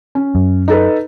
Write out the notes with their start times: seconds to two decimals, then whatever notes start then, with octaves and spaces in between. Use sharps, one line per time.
0.15 C#4
0.35 F#2
0.68 D#4 A4 B4